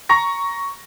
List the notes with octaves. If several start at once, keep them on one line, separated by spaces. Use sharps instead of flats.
A#5 C#6 A#6